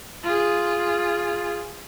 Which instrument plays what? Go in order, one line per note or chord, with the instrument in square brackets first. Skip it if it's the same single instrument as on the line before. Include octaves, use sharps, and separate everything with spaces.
[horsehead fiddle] F4 G#4